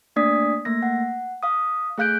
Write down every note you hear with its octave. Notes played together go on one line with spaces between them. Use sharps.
A3 A#3 D4 D5 D#6 B6
A3 A#3 A#6
F#5
F5 D#6
A3 G#4 F5 F#6 G6 D7